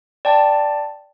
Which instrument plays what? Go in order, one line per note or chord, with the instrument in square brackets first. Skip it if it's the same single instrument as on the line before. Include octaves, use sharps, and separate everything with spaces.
[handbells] D5 G5 A5